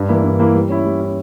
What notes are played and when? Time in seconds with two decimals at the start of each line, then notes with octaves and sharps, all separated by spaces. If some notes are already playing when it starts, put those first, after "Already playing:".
Already playing: G2
0.09 E3 A#3 E4
0.24 G2
0.39 E3 A#3 E4
0.55 G3
0.69 C#4 E4
0.85 G3
1.01 C#4 E4